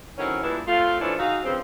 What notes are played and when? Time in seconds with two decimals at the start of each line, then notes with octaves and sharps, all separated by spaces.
0.17 A2 D#3 F#3 C4 C#4
0.42 G2 A#2 E3 G#3 D4 E4
0.67 F3 A3 C4 F4
1.00 E3 F3 A3 C#4 D4 E4
1.19 D#4 F#4 G#4 E5 F5
1.43 G2 C#3 F3 C4